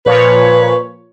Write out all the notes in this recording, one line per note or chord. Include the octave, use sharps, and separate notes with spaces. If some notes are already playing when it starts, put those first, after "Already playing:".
A#2 F3 B4 C#5